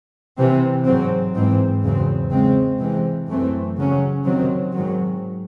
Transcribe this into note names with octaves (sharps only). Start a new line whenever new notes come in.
C3 E3 C4
G#2 F#3 C4
G#2 E3 C4
E2 C#3 F#3 C4
C#3 G#3 C4
C3 E3 G#3 C4
F#2 E3 A3 C4
C#3 F#3 C#4
C3 D#3 F#3 C4
G#2 D#3 F#3